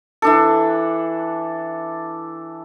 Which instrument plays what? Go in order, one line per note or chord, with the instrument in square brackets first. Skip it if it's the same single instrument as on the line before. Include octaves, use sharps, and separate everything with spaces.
[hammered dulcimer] E3 D4 A4